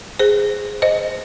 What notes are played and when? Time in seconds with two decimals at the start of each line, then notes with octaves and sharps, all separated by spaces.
0.19 G#4 C5
0.82 C5 D#5